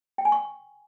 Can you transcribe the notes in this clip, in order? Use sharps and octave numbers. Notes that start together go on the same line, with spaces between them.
G5
G#5
C#6